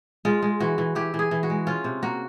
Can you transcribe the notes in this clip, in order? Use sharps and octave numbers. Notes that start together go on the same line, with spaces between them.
G#3 F4
G#3
E3 F#4
E3
E3 G4
E3
G#4
E3
F#4
G#3
C#4 F4
C3
A#3 F#4